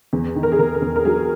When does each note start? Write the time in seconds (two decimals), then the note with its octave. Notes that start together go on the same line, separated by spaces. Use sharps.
0.13 E2
0.36 D#3
0.43 A#4
0.52 G#4
0.59 E2 A#4
0.75 A#4
0.82 E2
0.96 A#4
1.05 F#3 G#4